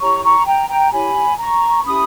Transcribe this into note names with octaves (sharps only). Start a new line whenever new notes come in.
E4 G4 C#5 A#5 C#6
A#5 C#6
G5 A#5
G5 A#5
E4 G4 C#5 G#5 B5
A#5 C#6
C#4 E4 G4 B5 D#6